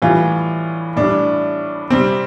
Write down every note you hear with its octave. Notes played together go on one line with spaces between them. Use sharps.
A2 E3 G3 F4
A2 G3 D4
C3 G3 C4